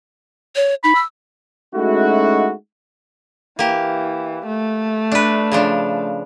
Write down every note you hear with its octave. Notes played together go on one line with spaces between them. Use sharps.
C#5
D#4 B5
E6
G#3 A3 C#4 D#4 E4 F#4
E3 A#3 G4
A3
D4 B4
C#3 F3 D4